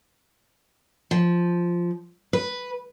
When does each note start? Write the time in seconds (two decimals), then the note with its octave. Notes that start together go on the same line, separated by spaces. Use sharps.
1.11 F3
2.33 B4